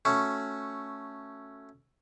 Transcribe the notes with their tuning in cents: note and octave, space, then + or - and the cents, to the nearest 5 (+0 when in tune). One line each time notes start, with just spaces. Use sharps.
A3 +5 C#4 +0 F#4 +0